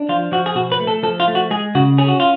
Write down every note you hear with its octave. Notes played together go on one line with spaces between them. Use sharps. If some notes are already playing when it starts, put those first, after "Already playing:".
Already playing: D4
F3 F4
F3 F#4
G#4
B2 F#4
B4
A3
A4
F3 A4
F4
A3
F#4
G#3 G#4
C#3 F#4
C#4 G#4
F#4
F4